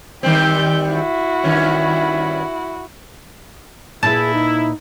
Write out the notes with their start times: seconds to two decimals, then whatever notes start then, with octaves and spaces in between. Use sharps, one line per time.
0.23 D#3 G3 C4 G4 G6
0.90 E4 F#4
1.44 G2 D#3 C#4
4.03 A#2 E4 G#4 B4 A5
4.34 D#4